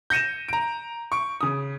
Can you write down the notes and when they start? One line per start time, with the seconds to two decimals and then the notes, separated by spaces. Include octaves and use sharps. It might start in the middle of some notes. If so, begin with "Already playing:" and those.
0.10 G6 A#6 C#7 D#7 E7
0.49 A#5 D7
1.12 C#6 D7
1.41 C#3 D#6